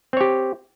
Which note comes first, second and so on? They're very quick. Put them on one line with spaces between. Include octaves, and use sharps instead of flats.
C4 C#5 G4